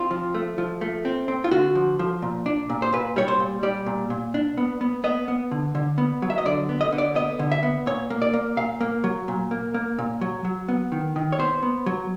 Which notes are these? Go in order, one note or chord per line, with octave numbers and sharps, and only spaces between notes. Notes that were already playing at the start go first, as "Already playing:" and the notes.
Already playing: C4 F4
F3
A3
F3
A3
C4
C4
F4
D3 F#4
F3
F3
A#2
D4
A#2
C5
A#2 B4
G3 C#5
C5
A#2
G3 D5
A#2
A#2
D4
B3
B3
B3 D#5
B3
D3
D3
B3
F#3
E5
D#5
D3 D5
B3
D#5
D3
D5
B3 D#5
D3
E5
B3
A#2 C#5
A#3
D5
A#3
A#2 F5
A#3
F#3
A#2
A#3
A#3
A#2
F#3
F#3
B3
D#3
D#3
C#5
B3 C5
B3
F#3